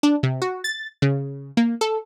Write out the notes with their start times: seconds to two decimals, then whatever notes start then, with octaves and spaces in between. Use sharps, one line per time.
0.03 D4
0.23 C3
0.42 F#4
0.64 A6
1.02 C#3
1.57 A#3
1.81 A4